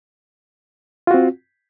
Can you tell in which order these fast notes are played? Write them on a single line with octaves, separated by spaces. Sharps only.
F4 F#4 C4